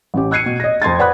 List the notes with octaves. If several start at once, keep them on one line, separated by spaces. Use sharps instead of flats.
A1 C#4 G4
E6 F#6 G#6 C7 C#7 D#7
B2
D#5 A#6
F2 C6 G#6 A6
B4 D5 F#5 B5 D#6 F#6